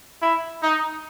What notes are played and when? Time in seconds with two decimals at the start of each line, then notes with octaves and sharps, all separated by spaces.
0.22 E4
0.63 D#4